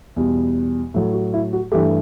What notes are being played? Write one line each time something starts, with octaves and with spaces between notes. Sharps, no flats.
E2 B2 G3
A2 F#3 A3
F#4
E4
F#4
G2 E3 A3 G4